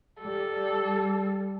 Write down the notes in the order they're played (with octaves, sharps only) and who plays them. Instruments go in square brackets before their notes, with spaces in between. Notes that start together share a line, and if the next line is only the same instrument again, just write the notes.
[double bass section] G3 [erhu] A4